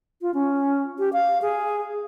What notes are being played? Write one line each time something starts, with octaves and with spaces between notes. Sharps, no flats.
F4
C#4
G4
F5
G#4